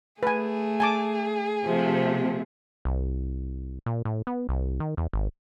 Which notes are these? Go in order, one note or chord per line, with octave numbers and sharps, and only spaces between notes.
A3 G#4 B4 G#5
G#5 A5 D6
C3 F3 A3
C2
A#2
A2
B3
C2
D#3
E2
G#1